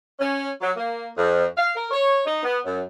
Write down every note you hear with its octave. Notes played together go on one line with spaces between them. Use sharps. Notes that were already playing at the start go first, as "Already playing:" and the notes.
C#4
F#3
A#3
F2
F5
A#4
C#5
D#4
B3
F#2